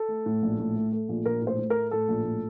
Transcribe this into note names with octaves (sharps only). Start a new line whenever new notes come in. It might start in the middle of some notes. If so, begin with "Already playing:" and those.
Already playing: A4
A3
A2
A#1
A2
A3
A3
A#1
A#1 A#4
A2
C5
A2
A3 A#4
A2 A4
A#1
A2